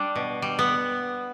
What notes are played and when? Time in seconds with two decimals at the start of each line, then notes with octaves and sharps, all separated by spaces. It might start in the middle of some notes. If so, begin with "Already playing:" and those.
Already playing: G3 D4
0.15 B2
0.42 G3
0.59 B3